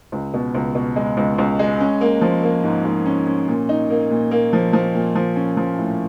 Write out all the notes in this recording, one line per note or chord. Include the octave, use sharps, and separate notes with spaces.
C#2
B2
C#2
B2
G#3
C#2
C#2
G#3
C#4
A#3
F3
A#3
G#2
G#2
C#4
C#4
A#2
D#4
A#3
A#2
A#3
F3
F3
A#2
F3
C#4
F3
A2